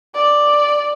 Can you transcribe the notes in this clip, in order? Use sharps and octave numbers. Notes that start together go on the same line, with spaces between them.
D5